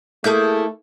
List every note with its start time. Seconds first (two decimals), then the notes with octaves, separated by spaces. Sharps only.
0.24 A3 A#3 E4 G#4 A4 G6